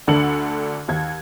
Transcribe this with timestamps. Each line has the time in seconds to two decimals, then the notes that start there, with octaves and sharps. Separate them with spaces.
0.07 D2 D3 D4 A4 C#7 F#7
0.88 D#2 G#6